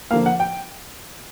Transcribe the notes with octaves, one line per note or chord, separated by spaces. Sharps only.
D3 F3 A#3 F5
F#5
G5